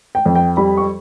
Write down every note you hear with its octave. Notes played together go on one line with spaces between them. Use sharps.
G5
F2
G5
G3 B5
C#6